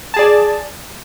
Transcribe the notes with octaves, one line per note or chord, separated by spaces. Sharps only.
G#4 D5 A5